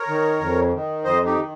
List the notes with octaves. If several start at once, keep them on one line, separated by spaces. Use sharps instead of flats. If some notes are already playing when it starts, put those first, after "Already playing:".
Already playing: A#4 C#5
D#3
F2
D#3
F2 C5 D#5
D#4 G4
D#3